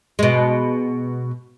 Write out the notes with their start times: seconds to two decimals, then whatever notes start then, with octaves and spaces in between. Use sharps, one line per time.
0.19 B2 G#3